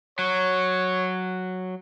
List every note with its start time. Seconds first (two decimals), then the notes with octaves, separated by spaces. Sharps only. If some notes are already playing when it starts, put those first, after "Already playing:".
0.19 F#3 C#5